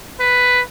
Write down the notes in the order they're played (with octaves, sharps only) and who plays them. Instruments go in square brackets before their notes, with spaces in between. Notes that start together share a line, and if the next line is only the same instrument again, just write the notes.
[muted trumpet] B4